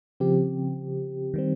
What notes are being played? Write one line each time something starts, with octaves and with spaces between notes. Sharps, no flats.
C#3 F3 C4 G4
D#3 G3 C4